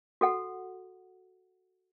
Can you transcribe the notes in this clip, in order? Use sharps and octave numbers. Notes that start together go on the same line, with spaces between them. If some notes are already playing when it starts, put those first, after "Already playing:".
F#4 A4 F#5